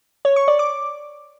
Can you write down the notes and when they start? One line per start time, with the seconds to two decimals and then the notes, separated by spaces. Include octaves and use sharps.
0.25 C#5
0.36 C#6
0.48 D5
0.59 D6